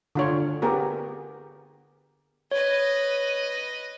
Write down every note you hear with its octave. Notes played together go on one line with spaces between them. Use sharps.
D3 F4 C#5
B3 G4 G#4 A#4
B4 C#5 D#5